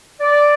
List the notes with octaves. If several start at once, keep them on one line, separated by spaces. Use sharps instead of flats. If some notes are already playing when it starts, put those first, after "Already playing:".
D5